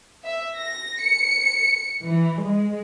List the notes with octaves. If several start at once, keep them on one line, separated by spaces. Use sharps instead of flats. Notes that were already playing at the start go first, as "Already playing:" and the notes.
E5
A#6
C#7
E3
G#3